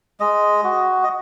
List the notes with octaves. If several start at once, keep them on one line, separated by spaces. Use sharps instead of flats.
G#3 D#5
F#4
D#5